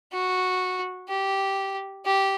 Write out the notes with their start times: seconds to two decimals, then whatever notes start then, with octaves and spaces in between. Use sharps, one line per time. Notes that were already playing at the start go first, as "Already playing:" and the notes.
0.13 F#4
1.08 G4
2.06 G4